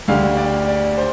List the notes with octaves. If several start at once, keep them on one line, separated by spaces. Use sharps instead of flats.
D2 D3 G3 F5
D5
D5
C5